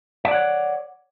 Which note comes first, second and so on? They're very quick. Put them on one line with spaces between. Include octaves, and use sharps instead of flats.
E5 D5 F#5 C#5